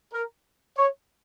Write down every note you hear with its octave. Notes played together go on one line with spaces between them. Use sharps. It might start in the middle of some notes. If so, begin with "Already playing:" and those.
A#4
C#5